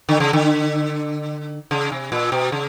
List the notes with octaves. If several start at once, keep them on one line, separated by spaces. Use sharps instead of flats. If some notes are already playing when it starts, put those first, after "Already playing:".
D3
C#3
D3
C#3
C3
A#2
B2
C#3